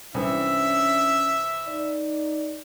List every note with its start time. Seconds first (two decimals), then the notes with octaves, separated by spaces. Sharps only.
0.14 C2 E3 C#4 D4 E4 E5 D#6
1.68 D#4 D5